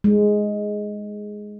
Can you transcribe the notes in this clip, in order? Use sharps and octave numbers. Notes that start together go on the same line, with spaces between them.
G#3